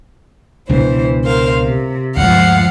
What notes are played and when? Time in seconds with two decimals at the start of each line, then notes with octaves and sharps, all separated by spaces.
0.69 C#2 B2 E3 D4 C5
1.23 A#4 C5 F5
1.64 C3
2.17 D2 G2 F3 G#3 F5 F#5